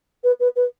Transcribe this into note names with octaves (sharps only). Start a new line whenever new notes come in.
B4
B4
B4